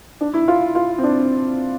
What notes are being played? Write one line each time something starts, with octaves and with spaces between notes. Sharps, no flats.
D4
E4
F4
F4
C4
D4